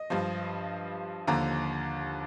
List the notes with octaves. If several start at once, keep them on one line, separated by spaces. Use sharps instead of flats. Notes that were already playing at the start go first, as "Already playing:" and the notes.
Already playing: D#5
G2 F3
D#2 D3 F3 A#5